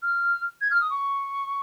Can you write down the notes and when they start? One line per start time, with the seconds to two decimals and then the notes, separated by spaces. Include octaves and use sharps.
0.03 F6
0.61 G#6
0.71 F6
0.81 D#6
0.91 C#6